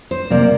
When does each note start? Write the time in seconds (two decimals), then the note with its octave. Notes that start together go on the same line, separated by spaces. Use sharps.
0.11 C5
0.30 C3 G3 A#3 D5